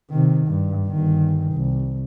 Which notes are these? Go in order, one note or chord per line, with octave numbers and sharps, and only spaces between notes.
C3 D#3
G2
G1 D#3
C2